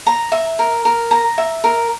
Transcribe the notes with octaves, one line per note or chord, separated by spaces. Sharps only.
A#5
E5
A#4
A#4
A#5
E5
A#4